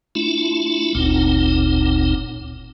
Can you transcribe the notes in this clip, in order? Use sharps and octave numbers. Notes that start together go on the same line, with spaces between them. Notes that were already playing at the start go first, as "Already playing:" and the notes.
A3 D4 E4 F4
F#1 D2 A#2 C4 D#4